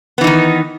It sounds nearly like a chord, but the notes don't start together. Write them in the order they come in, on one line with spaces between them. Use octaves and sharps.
B3 E3 D#4 D#3